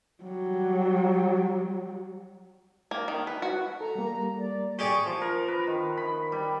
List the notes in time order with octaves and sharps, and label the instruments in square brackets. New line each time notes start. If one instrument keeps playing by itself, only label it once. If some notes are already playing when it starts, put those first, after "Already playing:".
[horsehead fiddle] F#3 G3
[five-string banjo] A#3
D#3
B4
F#4
[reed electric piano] A4 [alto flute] A#5
[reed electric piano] G3 A#3
[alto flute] D5
[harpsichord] G4 G#4 D5 [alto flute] C#6
[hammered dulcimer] F3
A#4
B4
D#3
B5
G3